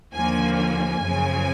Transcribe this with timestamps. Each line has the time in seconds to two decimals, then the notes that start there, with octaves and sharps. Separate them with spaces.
0.14 D#2 D3 F3 A#3 G#5
0.57 G#5
1.00 F#2 C#3 F3